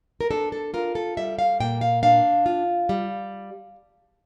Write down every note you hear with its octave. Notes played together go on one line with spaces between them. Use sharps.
A#4
D4 A4
A4
F4 A#4
A4
G3 E5
F5
A#2 G5
F5
D4 F5
F4
G3